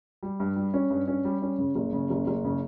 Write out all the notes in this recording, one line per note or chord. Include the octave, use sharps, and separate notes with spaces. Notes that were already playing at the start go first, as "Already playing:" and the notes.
G3
G2
G3
C#4
G2
C#4
G3
C#4
C#3
F#1
C#3
F#1
F#1
C#3